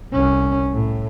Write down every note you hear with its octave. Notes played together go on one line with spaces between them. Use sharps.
C2 C#4
A2